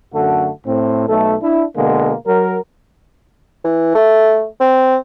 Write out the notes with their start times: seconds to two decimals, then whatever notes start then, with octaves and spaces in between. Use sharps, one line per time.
0.13 F#2 D3 A3 F#4 A4
0.66 A2 C4
1.08 B1 A3 A4
1.42 D4 E4
1.76 B2 D3 G#3 A#3
2.27 F#3 A#4
3.65 E3
3.95 A3
4.60 C4